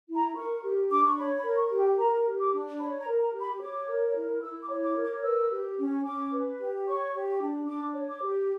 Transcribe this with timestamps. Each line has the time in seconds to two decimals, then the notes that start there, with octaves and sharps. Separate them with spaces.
0.09 E4
0.16 A#5
0.36 A#4 C#6
0.63 G4
0.90 D4 D6
1.04 C#6
1.17 C#5 B5
1.37 B5
1.44 A#4
1.57 C#6
1.71 G4
1.78 G5
1.98 A#4 A#5
2.26 G4
2.39 D6
2.52 D4
2.79 C#5 B5
2.99 A#5
3.06 A#4
3.20 A#5
3.33 G4
3.40 B5
3.61 C#5 D6
3.88 A#4
4.16 E4
4.42 E4 E6
4.62 D6
4.69 C#5
4.83 D6
4.96 A#4
5.03 D6
5.24 B4 E6
5.51 G4
5.78 C#4
6.05 C#4 D6
6.32 B4
6.59 G4
6.87 C#5 C#6
7.13 G4
7.41 D4
7.67 D4 D6
7.94 C#5
8.08 D6
8.22 G4